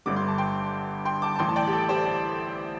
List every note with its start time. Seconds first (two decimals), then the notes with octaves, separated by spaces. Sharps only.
0.06 G1 G2 D3 G3 D6
0.16 C6
0.28 A5
0.38 G5 C6
1.05 G5 C6
1.22 A5 D6
1.35 A5
1.39 A1 A2 E3 G5 C6
1.49 A5
1.56 D5 G5
1.67 G4
1.73 A4
1.89 G4 C5
2.06 A4